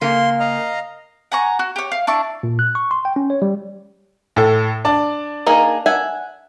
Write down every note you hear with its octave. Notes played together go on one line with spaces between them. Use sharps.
C#3 A#3 C6
D#5 F5 A#5
F#5 G#5 A#5 C#6
F#4
G4 C#5
F5
D4 E4 C#6
A#2
F#6
C#6
C6
G5
C#4
C#5
G3
A2 A4
D4 D5 A5
A#3 D#4 G#4
E5 F#5 G#5